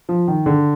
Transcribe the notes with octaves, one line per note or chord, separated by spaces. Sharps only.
F3
D#3
D3